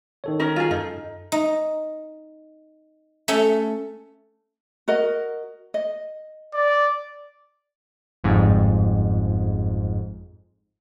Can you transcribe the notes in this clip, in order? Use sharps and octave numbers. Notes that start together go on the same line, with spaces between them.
D#3 A4 C#5
C#4 D#4 A#4
F4 G#4
F#2 D#4 A4
D#4
A3 C#4 A4
F#4 A#4 D#5
D#5
D5
G1 F2 G#2